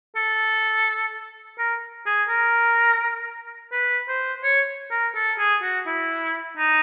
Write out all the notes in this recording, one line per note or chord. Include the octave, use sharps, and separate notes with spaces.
A4
A#4
G#4
A#4
B4
C5
C#5
A#4
A4
G#4
F#4
E4
D#4